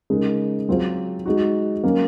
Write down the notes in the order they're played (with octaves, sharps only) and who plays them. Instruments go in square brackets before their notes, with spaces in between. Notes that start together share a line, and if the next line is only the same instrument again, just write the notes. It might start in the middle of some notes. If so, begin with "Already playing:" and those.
[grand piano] C#3 G#3 D#4 A#4
F#3 C4 F4 G#4 C5
G#3 D#4 F#4
F#3 A#3 C#4